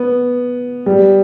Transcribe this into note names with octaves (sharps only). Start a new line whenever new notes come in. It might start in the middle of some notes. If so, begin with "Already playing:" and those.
Already playing: B3
G3